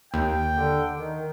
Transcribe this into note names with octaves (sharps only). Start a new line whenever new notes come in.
D#2 G5
D3
D#3